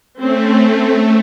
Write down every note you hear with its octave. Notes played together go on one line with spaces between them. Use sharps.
A3 C4 C#4